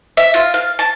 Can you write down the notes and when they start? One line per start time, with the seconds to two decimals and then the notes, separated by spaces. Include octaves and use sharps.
0.17 E5
0.34 F4
0.54 F5
0.79 A5